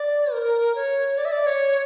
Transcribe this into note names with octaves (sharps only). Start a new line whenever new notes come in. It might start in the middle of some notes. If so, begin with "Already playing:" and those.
Already playing: D5
A#4
C#5
D5
E5
D5
C#5